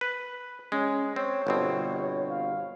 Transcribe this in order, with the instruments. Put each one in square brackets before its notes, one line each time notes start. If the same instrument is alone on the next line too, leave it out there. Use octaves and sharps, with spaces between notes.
[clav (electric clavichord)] B4
[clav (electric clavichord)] G#3 [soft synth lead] C#4
[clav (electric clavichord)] C4 [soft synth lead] C#5
[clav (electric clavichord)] G1 B2 C4
[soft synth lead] F5